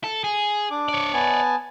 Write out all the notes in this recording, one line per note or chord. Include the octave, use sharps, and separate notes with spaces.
A4
G#4
D4 D6
C#5 D5
B3 G#5 A5